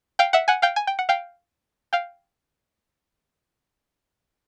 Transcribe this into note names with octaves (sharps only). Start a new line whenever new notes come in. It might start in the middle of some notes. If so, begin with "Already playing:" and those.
F5 G5
E5 F#5
F#5 G#5
F5 G5
G#5
G5
F#5
F5 G5
F5 G5